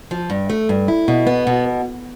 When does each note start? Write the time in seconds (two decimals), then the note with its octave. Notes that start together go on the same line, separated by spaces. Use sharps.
0.11 F3
0.30 G2
0.50 A3
0.69 G2
0.88 E4
1.08 B2
1.27 B3
1.47 B2